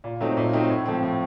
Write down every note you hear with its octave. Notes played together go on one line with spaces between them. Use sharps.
A#2
F#3 A3 C4 D#4
A#2
F#3 A3 C4 D#4
A2
F3 A3 C4
A2